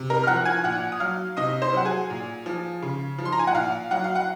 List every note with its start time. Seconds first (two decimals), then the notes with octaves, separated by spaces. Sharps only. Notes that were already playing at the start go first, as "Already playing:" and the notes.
Already playing: C3
0.10 A#4 A#5
0.23 F6
0.27 F3 F#5 F#6
0.45 G#5 G#6
0.64 A#2 F#5 F#6
0.92 D#6
1.00 F#3 F5 F6
1.37 C3 D#5 D#6
1.62 C5 C6
1.74 F#3 F#5
1.85 G#4 G#5
2.10 A#2
2.46 F3
2.83 C#3
3.18 F3
3.25 C6
3.32 A#5
3.39 G#5
3.47 F#5
3.55 A#2 F5
3.91 F#3 F#5
4.04 F5
4.15 F#5